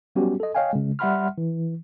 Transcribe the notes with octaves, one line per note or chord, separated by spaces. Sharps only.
F#3 G3 B3 C#4 F#4 G4
A4 D#5
C#5 D#5 F5 G5 G#5
C#3 G#3
G3 E5 F#5 B5 C6 F6
E3